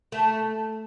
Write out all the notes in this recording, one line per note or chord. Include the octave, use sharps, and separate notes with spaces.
A3